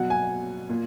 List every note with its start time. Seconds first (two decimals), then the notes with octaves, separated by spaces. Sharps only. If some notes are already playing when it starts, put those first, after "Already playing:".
Already playing: B2 F#3 F#5
0.10 G#5
0.69 A#2